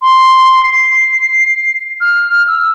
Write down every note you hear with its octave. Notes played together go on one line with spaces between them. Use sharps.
C6
C7
F6
E6